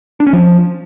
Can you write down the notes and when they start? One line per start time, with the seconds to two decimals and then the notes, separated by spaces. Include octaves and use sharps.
0.20 D4
0.27 C#4
0.33 F3